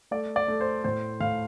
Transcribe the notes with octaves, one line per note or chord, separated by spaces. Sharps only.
A3 D5
D5
A3
C5
A2 C5
A2 F5